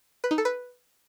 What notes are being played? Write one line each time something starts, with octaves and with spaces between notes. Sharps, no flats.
B4
D#4
A4
B4